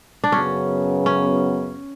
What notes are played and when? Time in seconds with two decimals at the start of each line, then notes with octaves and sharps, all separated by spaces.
0.24 D4
0.32 F#2 C#3 F#3 B3 C#4
1.06 C#4